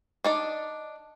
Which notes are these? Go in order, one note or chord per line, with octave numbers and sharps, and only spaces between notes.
D4 D#4 D5